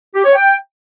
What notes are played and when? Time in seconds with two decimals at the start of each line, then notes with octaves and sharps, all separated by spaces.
0.15 G4
0.25 C#5
0.36 G5